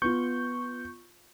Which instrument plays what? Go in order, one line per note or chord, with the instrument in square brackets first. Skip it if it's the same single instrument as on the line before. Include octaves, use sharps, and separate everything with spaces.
[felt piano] B3 F4 [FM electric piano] C#6 G6